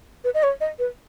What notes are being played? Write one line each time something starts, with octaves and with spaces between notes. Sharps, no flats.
B4
D#5
C#5
D#5
B4